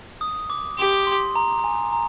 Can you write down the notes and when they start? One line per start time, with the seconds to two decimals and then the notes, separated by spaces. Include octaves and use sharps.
0.21 D#6
0.50 D6
0.79 G4 C6
1.07 C6
1.35 A#5
1.59 A#5
1.64 G#5
1.93 A#5